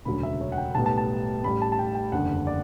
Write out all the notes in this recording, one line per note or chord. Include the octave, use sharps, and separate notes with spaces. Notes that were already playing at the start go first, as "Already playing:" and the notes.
E1 D2 C#3 F#3 B5
E5
C#5
F#5
G5
B1 A2 G3 B3 A5
A5
A5
A1 A2 G3 B5
A5
A5
G5
G5
F#1 E2 D3 G3 F#5
D5